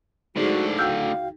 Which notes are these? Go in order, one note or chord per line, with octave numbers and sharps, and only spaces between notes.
A2 D3 G#3 D#4 F#4 G#4 C5 D5
C#2 F#4 F5 G5 E6 F6 G6